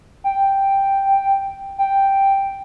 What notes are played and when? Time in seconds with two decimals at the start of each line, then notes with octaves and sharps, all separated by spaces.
0.24 G5
1.78 G5